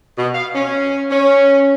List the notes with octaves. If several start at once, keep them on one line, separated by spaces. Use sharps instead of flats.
B2
F5
C#4
C#4